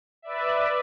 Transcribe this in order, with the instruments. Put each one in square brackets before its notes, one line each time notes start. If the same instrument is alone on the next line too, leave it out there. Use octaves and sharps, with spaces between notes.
[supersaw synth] B4 D5 E5